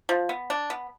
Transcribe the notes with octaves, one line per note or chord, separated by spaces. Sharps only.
F3
B3
D4
B3